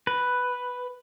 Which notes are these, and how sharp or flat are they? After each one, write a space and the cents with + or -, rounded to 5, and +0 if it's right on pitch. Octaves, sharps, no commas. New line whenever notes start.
B4 +0